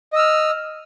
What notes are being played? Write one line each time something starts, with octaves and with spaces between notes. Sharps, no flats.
D#5 E6 F6